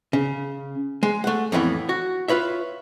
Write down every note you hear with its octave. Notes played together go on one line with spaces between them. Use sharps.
C#3
G#3
A3 F#5
F2 A2 E3 B3
F#4
F4 B4 C#5 E5